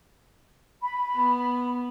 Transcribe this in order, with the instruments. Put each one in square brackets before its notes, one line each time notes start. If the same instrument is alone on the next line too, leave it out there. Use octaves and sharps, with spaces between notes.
[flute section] B5
[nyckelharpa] B3